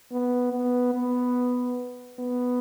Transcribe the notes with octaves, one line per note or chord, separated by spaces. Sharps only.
B3
B3
B3
B3